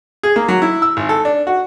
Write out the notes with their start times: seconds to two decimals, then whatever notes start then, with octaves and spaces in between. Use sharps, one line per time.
0.23 G#4
0.36 A#3
0.48 F#3
0.62 E4
0.82 E6
0.97 G#1
1.09 A4
1.25 D4
1.47 F#4